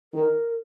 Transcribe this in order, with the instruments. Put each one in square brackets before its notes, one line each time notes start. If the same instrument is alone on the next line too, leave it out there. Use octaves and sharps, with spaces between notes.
[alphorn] D#3 [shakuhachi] A#4